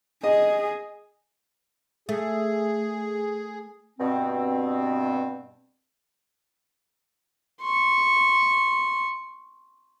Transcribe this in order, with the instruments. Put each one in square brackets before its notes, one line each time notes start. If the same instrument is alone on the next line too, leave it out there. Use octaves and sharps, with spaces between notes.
[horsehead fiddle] G#4 [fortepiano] D#5
[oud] A3 [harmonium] G#4
[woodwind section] G2 B2 C4
[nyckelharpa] C6 C#6